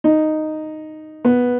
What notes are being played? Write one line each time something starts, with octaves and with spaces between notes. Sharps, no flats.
D#4
B3